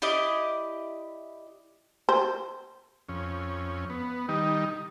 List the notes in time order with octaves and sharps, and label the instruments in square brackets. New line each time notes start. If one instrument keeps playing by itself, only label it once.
[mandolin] E4 G4 D5 D#5
[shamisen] C5
[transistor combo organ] F2 C#4
B3
D#3 G3 D#4